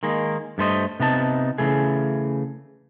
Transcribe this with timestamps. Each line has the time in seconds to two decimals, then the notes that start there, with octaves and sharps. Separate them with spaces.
0.03 D#3 G#3 A#3
0.58 G2 A3 C5 D#5
1.00 C3 B3 D#4 A5
1.58 C#3 E3 A3 G#4